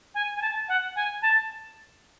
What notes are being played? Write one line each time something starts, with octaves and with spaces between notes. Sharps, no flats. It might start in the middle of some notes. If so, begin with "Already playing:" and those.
G#5
G#5
A5
F#5
G#5
A5